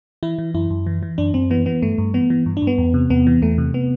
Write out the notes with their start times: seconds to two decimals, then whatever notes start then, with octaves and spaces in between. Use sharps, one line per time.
0.23 E3 E4
0.39 E3
0.54 F#2 E4
0.70 F#2
0.87 E3
1.03 E3
1.18 F#2 D4
1.34 F#2 C4
1.50 E3 B3
1.66 E3 B3
1.82 G2 A3
1.98 G2
2.14 E3 B3
2.30 E3
2.46 G2
2.57 D4
2.62 G2
2.67 B3
2.78 E2
2.94 C3
3.10 E2 B3
3.27 E3
3.42 E2 A3
3.58 C3
3.74 B3